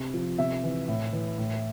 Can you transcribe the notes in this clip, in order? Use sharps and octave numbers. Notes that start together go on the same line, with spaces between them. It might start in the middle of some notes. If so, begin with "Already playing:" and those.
Already playing: C3
F3
C3 E5
E3
A2
E3
A2